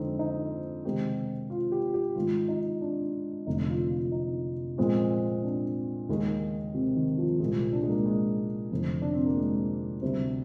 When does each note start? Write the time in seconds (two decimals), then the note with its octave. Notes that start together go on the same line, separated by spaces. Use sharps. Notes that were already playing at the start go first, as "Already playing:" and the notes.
Already playing: F2 D3 G#3 C4 D#4
0.19 D#4
0.85 C3 D#3 G#3 C4 G4
1.50 F4
1.72 G4
1.94 G4
2.16 G#2 D#3 G#3 F4
2.48 D#4
2.81 D4
3.47 F1 F2 D3 F3 D#4
3.68 F4
3.90 F4
4.12 D#4
4.78 A#2 F3 G#3 C4
5.38 C4
5.44 D4
6.09 D#2 D#3 G#3 A#3
6.74 C3
6.96 D#3
7.18 F3
7.39 C2 A#2 F3 G#3
7.73 D4
7.83 G#3
7.89 A#3
8.06 G#3
8.71 F1 F2 D3 F3
9.02 D4
9.13 C4
9.25 A#3
9.37 G#3
10.02 D2 C3 G3 C4